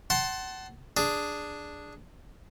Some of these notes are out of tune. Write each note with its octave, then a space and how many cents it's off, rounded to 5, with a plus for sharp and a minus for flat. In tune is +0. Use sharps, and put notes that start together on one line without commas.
F#5 +30 A5 +0 C6 +10
D4 +0 G#4 +0